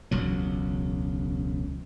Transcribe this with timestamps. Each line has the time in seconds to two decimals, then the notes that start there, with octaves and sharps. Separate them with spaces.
0.11 E1 C#2 F#3